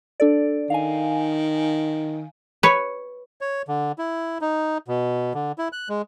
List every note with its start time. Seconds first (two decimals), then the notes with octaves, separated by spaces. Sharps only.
0.20 D4 A4 D5
0.70 D#3 F5 G#5
2.63 B4 C#5
3.41 C#5
3.68 D3
3.98 E4
4.41 D#4
4.88 B2
5.34 D3
5.58 E4
5.73 F#6
5.89 G#3